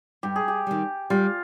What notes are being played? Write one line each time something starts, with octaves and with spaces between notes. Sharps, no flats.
G2 G4
G#4
G4
D#3 G3
G3 F4